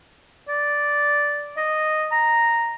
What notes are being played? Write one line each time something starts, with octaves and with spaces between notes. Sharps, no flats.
D5
D#5
A#5